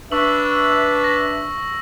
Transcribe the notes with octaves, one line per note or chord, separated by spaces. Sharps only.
D4 B4 E5 C#6 E6 F#7
A#6